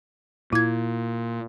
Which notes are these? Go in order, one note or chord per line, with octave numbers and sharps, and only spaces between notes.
A#2 E4 G#6